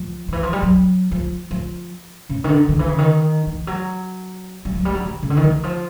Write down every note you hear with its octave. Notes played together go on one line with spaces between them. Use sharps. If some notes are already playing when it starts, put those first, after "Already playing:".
Already playing: F3
D#3
E3
F3
G3
F#3
F3
F3
C#3
D#3
D3
D#3
E3
C#3
D#3
E3
F#3
G3
F#3
G3
F#3
E3
C#3
D3
D#3
E3
F3